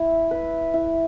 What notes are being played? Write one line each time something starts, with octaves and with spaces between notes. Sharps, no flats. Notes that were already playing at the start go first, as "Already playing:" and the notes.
Already playing: E4 E5
B4
E4